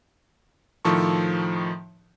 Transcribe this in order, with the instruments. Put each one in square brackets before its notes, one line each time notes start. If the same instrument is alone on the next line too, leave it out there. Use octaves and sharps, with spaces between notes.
[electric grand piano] A2 D#3 F3 A4 C#6